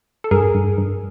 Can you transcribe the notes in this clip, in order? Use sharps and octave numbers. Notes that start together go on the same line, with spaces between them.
A4
G2 G#4 A#4
G2
G2